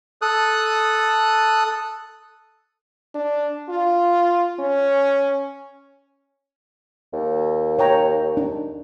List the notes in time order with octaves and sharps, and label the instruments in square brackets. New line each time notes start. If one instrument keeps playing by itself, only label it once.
[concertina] A4 D#6 F#6
[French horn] D4
F4
C#4
[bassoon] D#2
[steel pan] C#5 G5 A#5
D4 D#4